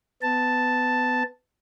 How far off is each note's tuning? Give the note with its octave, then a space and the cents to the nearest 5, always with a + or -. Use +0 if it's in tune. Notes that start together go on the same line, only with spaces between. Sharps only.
B3 +20 A5 +0